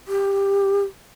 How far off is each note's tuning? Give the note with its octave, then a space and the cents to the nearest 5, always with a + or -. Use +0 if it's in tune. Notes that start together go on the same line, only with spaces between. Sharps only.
G4 +15